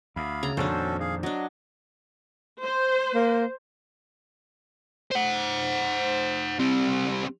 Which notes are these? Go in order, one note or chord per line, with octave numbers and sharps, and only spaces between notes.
D2 F5 B5
C#3 A#5
F2 A#2 D#3 C#4 D4 F#4 A4 C5
G#4 F5
F#3 D4 D#5
C5
A#3
C5 F#5
G3 C4